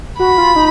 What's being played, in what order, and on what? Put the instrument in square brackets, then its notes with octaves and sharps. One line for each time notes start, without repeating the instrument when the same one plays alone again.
[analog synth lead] F#4 [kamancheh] B5
[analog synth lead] F4
D#4